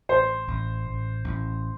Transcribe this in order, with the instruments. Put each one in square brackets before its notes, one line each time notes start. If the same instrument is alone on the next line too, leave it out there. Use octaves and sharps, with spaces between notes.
[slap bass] A1 [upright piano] C5
[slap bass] A1
A1
A1